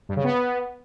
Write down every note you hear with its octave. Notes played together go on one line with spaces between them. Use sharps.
G2
C#3
B3